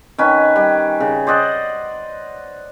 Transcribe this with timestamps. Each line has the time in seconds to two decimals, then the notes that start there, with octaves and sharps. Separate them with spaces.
0.18 D#3 C#4 B4
0.56 G3
1.00 C#3
1.27 C5 D5 D#5 F#5